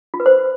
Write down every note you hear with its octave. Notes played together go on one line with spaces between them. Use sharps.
F4
B4
C5